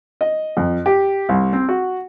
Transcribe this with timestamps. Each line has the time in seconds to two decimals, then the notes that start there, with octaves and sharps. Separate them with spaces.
0.21 D#5
0.57 F2
0.86 G4
1.29 C2
1.53 C4
1.69 F#4